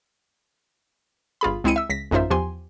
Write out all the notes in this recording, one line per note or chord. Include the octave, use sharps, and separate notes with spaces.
G1 F4 G#4 B5
C#2 G#3 C4 E4 C#7 D#7
E5 E6
C#2 A#6 B6
A1 F#2 D#4 F4 C5 E5
E2 F3 G4 G#5 C6